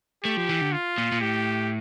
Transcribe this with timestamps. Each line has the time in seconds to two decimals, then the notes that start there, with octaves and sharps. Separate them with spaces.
0.25 A3 G4
0.37 F3
0.49 E3
0.61 D3
0.73 F4
0.98 A#2
1.12 A#2
1.21 A2 G4